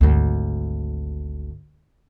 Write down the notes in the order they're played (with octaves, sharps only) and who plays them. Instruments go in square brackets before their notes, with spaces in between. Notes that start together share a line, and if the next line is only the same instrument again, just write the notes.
[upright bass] G#1 D2